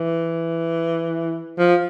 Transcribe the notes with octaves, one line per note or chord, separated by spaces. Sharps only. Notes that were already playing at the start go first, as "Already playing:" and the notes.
Already playing: E3
F3